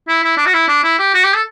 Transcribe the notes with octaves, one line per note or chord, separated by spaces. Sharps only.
E4
E4
D4
F#4
E4
D4
E4
G4
F#4
G4
A4